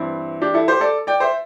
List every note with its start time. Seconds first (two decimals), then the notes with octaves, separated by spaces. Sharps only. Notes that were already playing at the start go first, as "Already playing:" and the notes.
Already playing: G2 E3 C4 E4
0.42 D4 G4
0.54 E4 A4
0.68 G4 C5
0.81 A4 D5
1.07 D5 G5
1.20 C5 E5